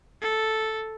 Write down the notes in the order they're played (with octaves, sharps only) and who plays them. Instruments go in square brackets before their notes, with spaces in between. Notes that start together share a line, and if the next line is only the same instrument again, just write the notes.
[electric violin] A4